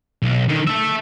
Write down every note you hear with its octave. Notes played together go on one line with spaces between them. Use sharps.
B1
D3 D#3
A4 E5